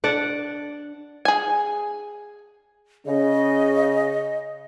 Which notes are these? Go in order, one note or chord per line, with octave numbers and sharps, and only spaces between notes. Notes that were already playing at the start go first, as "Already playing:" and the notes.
D4 D5 F#5
G#4 G#5
C#3 D#5